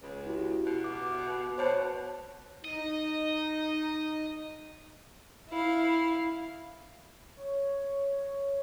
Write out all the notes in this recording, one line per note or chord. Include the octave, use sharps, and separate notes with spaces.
C#2
E4 F#4 G4
B2
D6
B2 C5 C#5 A5
D#4 D#5
E4 F5
C#5